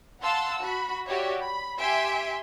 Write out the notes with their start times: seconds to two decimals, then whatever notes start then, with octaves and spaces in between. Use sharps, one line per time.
0.22 F5 F#5 A5 C6 E6
0.61 F#4 B5
1.07 F#4 G4 C#5 D5 E5
1.41 B5
1.78 G4 E5 G#5 C6 B6 D7